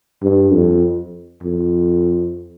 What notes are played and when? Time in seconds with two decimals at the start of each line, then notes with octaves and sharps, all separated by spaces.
0.23 G2
0.53 F2
1.43 F2